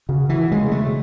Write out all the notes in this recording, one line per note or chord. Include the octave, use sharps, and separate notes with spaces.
C#3 F#4
E3 F#4
C#3 G#3
C#3 A3